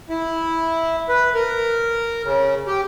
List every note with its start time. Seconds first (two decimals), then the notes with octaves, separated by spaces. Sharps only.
0.09 E4
1.09 B4
1.35 A#4
2.24 C#3
2.67 G4